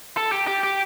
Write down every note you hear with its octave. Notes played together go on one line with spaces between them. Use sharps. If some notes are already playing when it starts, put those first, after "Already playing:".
A4
G4
G4
G4